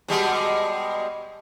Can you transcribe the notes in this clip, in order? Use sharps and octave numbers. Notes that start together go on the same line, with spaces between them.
B2 G3 G#3